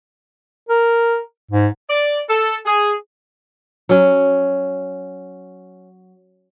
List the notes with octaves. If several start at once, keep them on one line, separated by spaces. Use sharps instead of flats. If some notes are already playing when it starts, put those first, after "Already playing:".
A#4
G#2
D5
A4
G#4
F#3 C#4